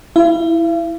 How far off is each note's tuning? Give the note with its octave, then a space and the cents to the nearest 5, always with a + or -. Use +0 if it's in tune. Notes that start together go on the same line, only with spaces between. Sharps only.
E4 +0 F5 -45